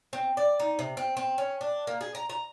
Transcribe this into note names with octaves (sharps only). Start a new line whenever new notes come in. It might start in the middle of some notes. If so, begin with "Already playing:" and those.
C4
D5
D#4
C3
C4
C4
C#4
D4
A#3
G#4
A#5
A#5